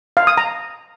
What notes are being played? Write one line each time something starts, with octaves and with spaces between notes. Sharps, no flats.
F5
D#6
A#5